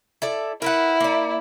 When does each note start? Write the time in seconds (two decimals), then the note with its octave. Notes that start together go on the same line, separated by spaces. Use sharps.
0.22 E4 A4 D5
0.62 E4 A#4 B4 F#5
1.01 A#3 D5